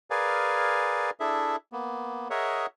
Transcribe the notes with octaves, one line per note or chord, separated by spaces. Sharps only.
G#4 A#4 B4 D5 F5 G#5
D4 E4 G#4 A4 E5
A#3 B3
G#4 A#4 C#5 D#5 E5 F#5